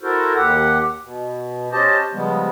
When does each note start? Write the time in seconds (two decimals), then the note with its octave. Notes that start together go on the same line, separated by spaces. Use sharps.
0.03 E4 F#4 A4 A#4 C5
0.35 D#2 G4 F#5
1.03 B2
1.72 C#4 G4 C5 D#5 A5
2.13 C#3 F3 G3 G#3 B3